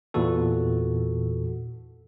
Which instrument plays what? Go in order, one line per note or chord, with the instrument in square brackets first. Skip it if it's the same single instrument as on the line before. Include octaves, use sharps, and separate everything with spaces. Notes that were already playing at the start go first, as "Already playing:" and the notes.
[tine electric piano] E2 A#2 E3 F#4 A4